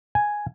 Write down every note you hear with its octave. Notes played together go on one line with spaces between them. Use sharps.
G#5